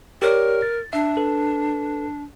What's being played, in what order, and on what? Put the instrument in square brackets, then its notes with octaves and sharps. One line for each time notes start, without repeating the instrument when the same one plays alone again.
[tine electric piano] G4 C#5 D5 [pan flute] A#4
[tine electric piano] A6
[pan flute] D4 [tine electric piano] E5
[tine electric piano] A4 B4